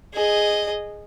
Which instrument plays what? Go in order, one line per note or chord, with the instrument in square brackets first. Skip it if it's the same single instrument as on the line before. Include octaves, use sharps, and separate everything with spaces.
[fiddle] G#4 D#5